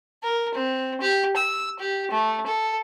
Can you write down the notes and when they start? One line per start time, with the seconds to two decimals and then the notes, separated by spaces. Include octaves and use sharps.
0.23 A#4
0.54 C4
1.00 G4
1.36 E6
1.79 G4
2.11 A3
2.46 A4